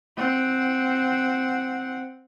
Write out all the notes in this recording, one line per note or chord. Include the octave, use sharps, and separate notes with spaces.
C4 F#5